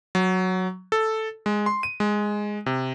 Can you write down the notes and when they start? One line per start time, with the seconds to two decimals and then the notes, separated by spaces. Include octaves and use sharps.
0.15 F#3
0.92 A4
1.46 G#3
1.66 C6
1.83 D#7
2.00 G#3
2.66 C3